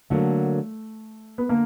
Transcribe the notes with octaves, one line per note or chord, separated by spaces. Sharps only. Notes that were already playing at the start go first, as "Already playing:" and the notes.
D3 F#3 A3 A#3
B3
D3 A#3